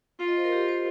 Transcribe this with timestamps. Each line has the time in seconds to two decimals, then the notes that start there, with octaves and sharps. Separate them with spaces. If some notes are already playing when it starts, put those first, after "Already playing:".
0.20 F4 F5
0.28 D#5
0.37 C5
0.44 A#4
0.52 G4
0.61 A#4
0.69 C5